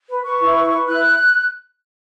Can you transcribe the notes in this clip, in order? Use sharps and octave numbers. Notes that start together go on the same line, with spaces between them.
B4
B4 C#6
E4
B4
B4
E4 F#6